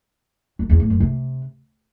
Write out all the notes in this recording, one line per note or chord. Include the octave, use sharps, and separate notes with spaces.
F#2
E2
A2
F#2
C3